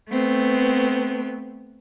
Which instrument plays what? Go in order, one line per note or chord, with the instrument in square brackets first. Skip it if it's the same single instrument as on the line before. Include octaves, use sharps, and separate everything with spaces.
[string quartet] A3 B3 C4